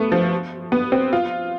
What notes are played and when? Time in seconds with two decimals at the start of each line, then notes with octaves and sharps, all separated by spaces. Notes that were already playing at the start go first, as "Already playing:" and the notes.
Already playing: A3 B3
0.12 F3
0.72 B3
0.92 C4
1.13 F4